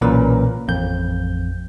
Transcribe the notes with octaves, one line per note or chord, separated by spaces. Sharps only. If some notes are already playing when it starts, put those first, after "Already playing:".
B1 A#2 E3 C#4 A#4 B4
A1 F2 G6